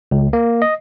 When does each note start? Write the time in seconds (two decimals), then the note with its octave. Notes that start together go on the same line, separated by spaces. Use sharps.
0.11 C#2
0.33 A#3
0.62 D#5